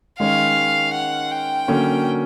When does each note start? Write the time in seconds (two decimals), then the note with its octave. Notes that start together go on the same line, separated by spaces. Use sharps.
0.19 D#3 G#3 C#4 F5
0.94 F#5
1.31 G5
1.68 D3 F#3 A#3 C#4